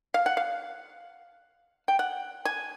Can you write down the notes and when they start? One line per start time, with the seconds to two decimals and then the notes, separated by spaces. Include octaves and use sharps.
0.14 F5
0.26 F#5
0.37 F5
1.88 G5
1.99 F#5
2.45 G#5